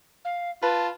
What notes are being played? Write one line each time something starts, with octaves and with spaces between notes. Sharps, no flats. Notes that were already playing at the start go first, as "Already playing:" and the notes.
F5
F4 B4 A5